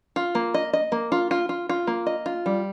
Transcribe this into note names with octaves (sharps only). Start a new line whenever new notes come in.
F4
A#3
D#5
D#5
A#3
F4
F4
F4
F4
A#3
D#5
F4
G3